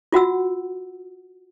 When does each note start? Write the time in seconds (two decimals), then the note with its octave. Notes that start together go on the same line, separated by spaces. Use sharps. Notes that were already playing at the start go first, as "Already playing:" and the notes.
0.12 F4 F#4 F#5 E6